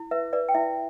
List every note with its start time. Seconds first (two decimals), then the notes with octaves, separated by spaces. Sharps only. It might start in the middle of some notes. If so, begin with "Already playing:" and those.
Already playing: E4
0.11 B4 E5
0.33 B4 D5
0.49 G5
0.55 E4 E5